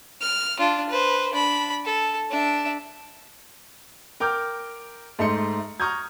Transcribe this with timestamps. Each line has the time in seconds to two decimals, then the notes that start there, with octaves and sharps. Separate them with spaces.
0.21 F6
0.59 D4 F4
0.89 B4 C5
1.33 D4 B5
1.85 A4
2.30 D4 E5
4.20 A#4 G5 D6 F6 G6
5.19 G#2 A3 D#4 C6 C#7
5.80 A#5 C#6 D#6 F6 G6 G#6